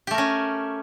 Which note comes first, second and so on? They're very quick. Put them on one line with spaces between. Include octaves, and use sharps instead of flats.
G4 A3 A#4 C#4